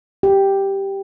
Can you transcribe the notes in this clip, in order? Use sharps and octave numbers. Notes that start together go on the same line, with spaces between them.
G4